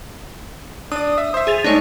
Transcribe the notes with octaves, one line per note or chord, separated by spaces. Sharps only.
D4 D5 D#6
E5
C5 E5
G#4 A6 F7
G#3 A3 D4 D#4 C#5